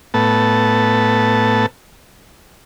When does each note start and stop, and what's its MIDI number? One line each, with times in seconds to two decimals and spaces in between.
0.14 1.66 45
0.14 1.66 59
0.14 1.66 81